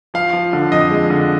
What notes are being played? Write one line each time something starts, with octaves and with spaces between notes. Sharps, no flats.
F3 F5
F3
D3
F2 D#5
G#3
D3